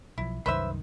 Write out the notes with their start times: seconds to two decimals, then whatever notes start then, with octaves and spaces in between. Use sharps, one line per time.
0.18 B1 F3 E4
0.46 C2 F#2 D#3 B4 C5 E5